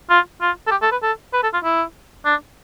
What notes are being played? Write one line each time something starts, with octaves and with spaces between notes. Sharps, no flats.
F4
F4
A4
G4
A4
B4
A4
B4
A4
F4
E4
D4